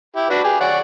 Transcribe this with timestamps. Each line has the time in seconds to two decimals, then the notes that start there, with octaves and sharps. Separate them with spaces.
0.16 E4 G4
0.30 D4 F#4 B4
0.44 G4 G#4
0.60 C#5 D5 F#5